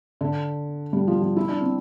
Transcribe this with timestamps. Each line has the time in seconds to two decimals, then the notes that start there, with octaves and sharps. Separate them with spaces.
0.21 D3
0.93 G3
1.08 F3
1.22 F3
1.36 E4
1.48 D4
1.60 C4